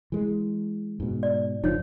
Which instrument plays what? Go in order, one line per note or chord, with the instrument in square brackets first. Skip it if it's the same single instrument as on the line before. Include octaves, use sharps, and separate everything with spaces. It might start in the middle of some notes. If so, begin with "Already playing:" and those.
[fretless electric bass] E3 G#3
G#2 B2
[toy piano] D5
[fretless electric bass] F#1 F3 [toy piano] D#4 C#5